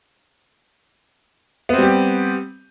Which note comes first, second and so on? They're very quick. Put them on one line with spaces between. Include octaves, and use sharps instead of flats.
B3 C4 G3 G4